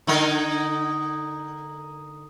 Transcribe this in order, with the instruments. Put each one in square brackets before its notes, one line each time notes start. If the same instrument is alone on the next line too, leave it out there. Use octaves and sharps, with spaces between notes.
[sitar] D3 D#4 A#4